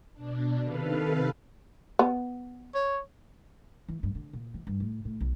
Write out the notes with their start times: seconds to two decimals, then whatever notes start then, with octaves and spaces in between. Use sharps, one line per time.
0.14 B2 D4
0.64 C3 D#3 A4 B4 F5
1.99 B3
2.75 C#5
3.89 E3
4.03 G2
4.15 D3
4.33 A#2
4.54 E3
4.67 G2
4.80 A2
5.05 A2
5.20 B1